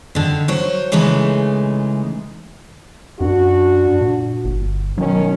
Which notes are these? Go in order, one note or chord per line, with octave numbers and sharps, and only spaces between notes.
D3 D#3
F#3 C5 C#5
C#3 E3 G#3 A3 D#4
F#2 D4 F#4
A#2
G1
B2 D#3 F#3 C#4